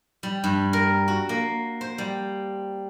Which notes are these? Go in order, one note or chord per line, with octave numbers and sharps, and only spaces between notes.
G3
G2
A#4
F#4
A#3
C5
G3